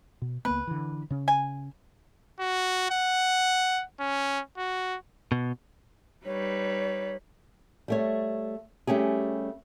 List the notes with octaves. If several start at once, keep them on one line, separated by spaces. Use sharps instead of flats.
B2
C#2 A#3 B3 B4
D3 E3
C#3 C#4
G#5
F#4
F#5
C#4
F#4
B2
G3 D#4 B4 C#5
G3 A3 C#5
G3 A3 C#4 G4 G#4